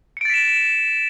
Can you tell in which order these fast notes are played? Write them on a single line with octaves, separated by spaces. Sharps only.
C#7 D7 A6 B6 E7